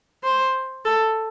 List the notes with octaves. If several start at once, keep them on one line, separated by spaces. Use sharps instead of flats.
C5
A4